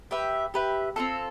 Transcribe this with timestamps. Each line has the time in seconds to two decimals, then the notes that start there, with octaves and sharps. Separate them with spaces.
0.11 G4 B4 E5
0.54 G4 B4 E5
0.96 C4 F4 A4